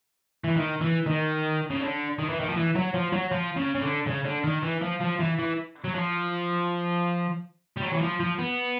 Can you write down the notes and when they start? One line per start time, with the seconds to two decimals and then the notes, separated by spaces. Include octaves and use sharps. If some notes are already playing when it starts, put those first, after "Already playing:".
0.44 E3
0.56 D#3
0.81 E3
1.06 D#3
1.71 C#3
1.81 D3
2.19 D#3
2.29 E3
2.40 D#3
2.49 F3
2.57 E3
2.75 F#3
2.94 F3
3.12 F#3
3.32 F3
3.56 C#3
3.75 C#3
3.82 D3
4.07 C#3
4.25 D3
4.44 D#3
4.63 E3
4.81 F3
5.00 F3
5.20 E3
5.39 E3
5.85 F#3
5.95 F3
7.77 G3
7.82 F#3
7.93 E3
8.01 F3
8.20 F3
8.39 B3